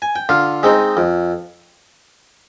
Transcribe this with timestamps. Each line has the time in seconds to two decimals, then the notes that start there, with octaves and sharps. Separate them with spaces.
0.02 G#5
0.16 G5
0.29 D3 F4 F5
0.63 G#3 C4 D#4
0.97 F2